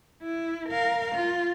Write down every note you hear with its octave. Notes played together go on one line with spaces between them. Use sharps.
E4
A#4 F5
F4